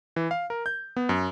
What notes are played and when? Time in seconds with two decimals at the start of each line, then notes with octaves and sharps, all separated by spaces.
0.16 E3
0.31 F5
0.50 A#4
0.66 G6
0.96 B3
1.09 F#2